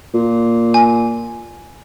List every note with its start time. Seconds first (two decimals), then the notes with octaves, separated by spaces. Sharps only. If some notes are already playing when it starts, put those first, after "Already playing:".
0.14 A#2
0.74 G#5